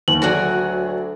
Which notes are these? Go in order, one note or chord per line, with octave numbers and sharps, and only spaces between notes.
D#2 F#7
D2 F#3 F#4 G#4 D5